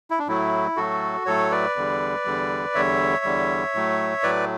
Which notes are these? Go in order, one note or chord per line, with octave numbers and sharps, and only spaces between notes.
E4
D4
A2 F#3 A3 E4
A2 F#3 A3 F#4 A4
A2 F#3 A3 A4 C#5
B4 D5
E2 D3 G3
E2 D3 G3
E2 D3 G3 C#5 E5
E2 D3 G3
A2 F#3 A3
A2 F#3 A3 B4 D5